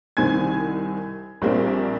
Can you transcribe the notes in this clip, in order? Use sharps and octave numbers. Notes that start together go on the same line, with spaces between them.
C2 D#3 C4 G#5 G#6
A#1 G3 A#3 C4